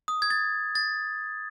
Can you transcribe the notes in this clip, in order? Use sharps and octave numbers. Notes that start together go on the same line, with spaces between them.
D#6
G#6
A6
A6